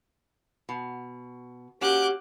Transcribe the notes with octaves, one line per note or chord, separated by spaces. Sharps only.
B2
A#3 C#4 F#4 G4 D6 F#6 G6